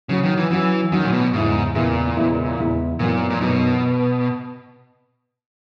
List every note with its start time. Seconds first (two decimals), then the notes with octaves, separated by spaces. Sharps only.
0.09 C#3 F#3 C#4 F#4
0.24 D#3
0.37 E3
0.50 E3 F#3 C#4 F#4
0.92 D#3 F#3 C#4 F#4
1.04 A#2
1.13 B2
1.33 E2 G#2 C#3 G#3 B3 E4
1.75 E2 A#2 C#3 G#3 B3 E4
2.16 E2 C#3 G#3 B3 E4
2.58 E2 C#3 G#3 B3 E4
2.99 F#2 A#2 E3 B3 D#4 F#4
3.30 A#2
3.40 F#2 B2 E3 B3 D#4 F#4